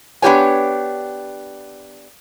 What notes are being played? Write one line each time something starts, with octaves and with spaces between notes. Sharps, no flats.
B3 D4 E4 G4 C#5 G#5